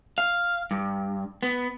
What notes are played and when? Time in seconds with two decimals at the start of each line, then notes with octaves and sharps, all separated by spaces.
0.18 F5
0.71 G2
1.43 B3